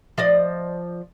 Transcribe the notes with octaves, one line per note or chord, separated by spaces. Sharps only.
F3 D5 D#5